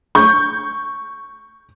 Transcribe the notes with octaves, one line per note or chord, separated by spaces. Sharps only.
C#6 G6